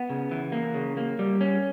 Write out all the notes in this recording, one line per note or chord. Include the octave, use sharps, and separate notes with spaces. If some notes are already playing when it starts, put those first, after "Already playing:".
Already playing: B3
C#3
E3
A#3
C#3
A#3
G3
C#4